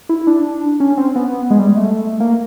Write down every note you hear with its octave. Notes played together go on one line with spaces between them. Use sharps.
E4
D4
C#4
C4
B3
G#3
G3
G#3
A3
A#3